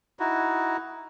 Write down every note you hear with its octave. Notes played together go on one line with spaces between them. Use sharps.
D#4 E4 F#4